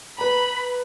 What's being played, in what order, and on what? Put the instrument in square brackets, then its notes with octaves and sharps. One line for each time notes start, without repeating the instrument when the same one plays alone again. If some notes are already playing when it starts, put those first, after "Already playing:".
[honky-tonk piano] B4 A#5 [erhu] B5